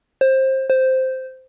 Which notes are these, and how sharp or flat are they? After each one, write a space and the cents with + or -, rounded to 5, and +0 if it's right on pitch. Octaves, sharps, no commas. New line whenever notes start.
C5 +20
C5 -5